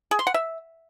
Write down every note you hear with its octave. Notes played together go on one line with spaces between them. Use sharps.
G#4
C6
F#5
E5